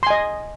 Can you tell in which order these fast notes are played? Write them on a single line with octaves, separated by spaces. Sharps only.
C6 G#5 D#5